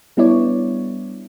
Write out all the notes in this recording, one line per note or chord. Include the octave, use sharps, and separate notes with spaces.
G3 B3 D4 E4 C#5 D5